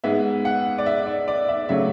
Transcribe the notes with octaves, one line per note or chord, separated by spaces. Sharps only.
G#2 G#3 B3 E5
F#5
D5
E5
D5
D5
E5
C#3 F#3 A3 E5